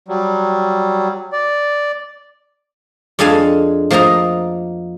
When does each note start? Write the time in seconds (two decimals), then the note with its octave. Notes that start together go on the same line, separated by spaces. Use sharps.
0.08 F#3 G3
1.33 D5
3.19 F2 G#3 D4 A4 F5 G#5
3.90 F3 A#3 A#4 D#5 A#5